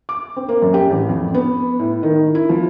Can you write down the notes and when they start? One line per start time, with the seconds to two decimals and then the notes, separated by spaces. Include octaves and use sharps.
0.09 D6
0.36 C4
0.48 A#3
0.62 F#2
0.74 G4
0.90 A1
1.09 F2
1.34 B3
1.79 A2
2.03 D#3
2.35 E4
2.49 F3